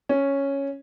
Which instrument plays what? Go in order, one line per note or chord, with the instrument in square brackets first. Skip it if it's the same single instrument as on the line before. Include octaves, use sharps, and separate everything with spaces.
[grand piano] C#4